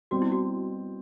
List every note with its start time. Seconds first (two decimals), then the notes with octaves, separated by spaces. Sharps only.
0.11 B2 G3 C4 F#4
0.22 E4
0.32 F#4